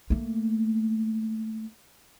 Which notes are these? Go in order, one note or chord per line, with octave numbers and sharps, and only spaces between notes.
A3 A#3